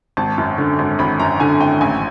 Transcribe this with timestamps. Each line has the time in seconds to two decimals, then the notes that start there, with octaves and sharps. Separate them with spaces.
0.17 G#1 A5
0.38 F#2
0.58 D3
0.79 G#1
0.99 G#1 B5
1.20 F#2 A#5
1.40 D3 G#5
1.60 G#1 G5
1.81 A1 G#5